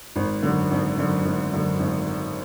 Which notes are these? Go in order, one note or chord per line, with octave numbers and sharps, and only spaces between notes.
G#1
F#2 D3
G#1
F#2 D3
G#1
F#2 D3
G#1